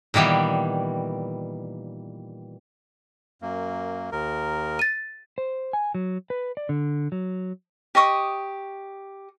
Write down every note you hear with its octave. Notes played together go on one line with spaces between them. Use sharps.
A#2 D#3 E3 G3 B3
F#2 A#3
D#2 A#4
A6 D#7
C5
G#5
F#3
B4
D5
D3
F#3
G4 D#5 C#6 D#6